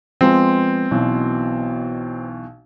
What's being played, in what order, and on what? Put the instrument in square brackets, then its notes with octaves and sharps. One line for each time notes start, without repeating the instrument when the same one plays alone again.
[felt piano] F3 G#3 B3 [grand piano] C4
[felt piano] B1 B2 E3